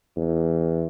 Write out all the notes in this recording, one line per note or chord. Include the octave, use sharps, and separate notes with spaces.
E2